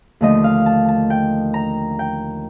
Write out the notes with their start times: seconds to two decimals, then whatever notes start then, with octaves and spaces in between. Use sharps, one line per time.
0.21 D#2 D3 F3 A3 D#5
0.44 F5
0.66 A5
0.88 A5
1.10 G5
1.54 A#5
1.99 G5